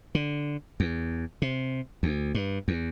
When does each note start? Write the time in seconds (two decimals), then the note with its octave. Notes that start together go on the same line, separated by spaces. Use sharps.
0.15 D3
0.80 E2
1.42 C3
2.03 D2
2.34 G2
2.68 E2